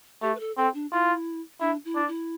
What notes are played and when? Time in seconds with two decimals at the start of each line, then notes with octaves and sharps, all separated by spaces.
0.22 A3 G4
0.35 B4
0.40 A4
0.57 C4 A4
0.74 D4
0.92 E4 F4
1.61 D4 E4
1.85 E4
1.95 D4
2.08 E4